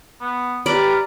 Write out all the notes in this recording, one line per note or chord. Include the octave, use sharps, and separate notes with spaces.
B3
G4 B4 D5 A#5 D6 F6